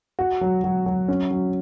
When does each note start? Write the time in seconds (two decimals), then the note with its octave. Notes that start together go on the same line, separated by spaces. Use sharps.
0.19 F#4
0.41 F#3
0.64 F#3
0.86 F#3
1.08 C#4
1.31 F#3